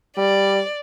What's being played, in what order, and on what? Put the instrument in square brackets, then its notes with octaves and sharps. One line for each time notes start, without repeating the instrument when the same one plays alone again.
[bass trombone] G3 [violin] D5